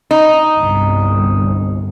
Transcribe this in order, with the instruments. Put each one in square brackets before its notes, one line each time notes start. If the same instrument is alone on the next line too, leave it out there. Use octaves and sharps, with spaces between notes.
[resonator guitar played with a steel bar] D#4
[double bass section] G1 C2